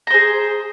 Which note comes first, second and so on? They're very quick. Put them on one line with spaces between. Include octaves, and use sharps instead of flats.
A#5 C5 G#4